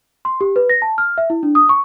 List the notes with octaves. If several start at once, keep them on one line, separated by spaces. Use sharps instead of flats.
C6
G4
B4
A#6
A5
F6
E5
E4
D4
D#6
C#6